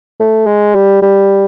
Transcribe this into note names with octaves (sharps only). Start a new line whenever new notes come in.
A3
G#3
G3
G3